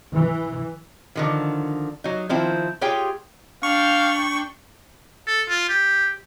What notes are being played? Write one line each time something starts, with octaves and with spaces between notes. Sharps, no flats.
E3
D3 D#3 F3
F#3 D#4
D#3 F3 C4 E4
F4 G4 G#4 C#5 G5
D4 F5 G5 C#6
A4
F4
G4